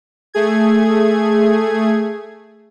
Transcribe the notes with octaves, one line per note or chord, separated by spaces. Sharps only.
A3 G#4 G#6